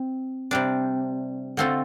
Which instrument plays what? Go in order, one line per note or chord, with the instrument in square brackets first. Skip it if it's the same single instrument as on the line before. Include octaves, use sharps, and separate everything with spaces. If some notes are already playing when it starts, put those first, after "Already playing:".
Already playing: [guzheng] C4
C3 G3 D4
D3 A3 C4 F4 A4